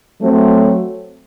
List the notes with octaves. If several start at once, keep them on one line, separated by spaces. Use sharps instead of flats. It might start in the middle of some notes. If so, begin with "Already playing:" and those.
F#3 A3 C4